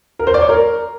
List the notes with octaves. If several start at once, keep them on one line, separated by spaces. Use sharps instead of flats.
A#4
C5
D5
C#5
A#4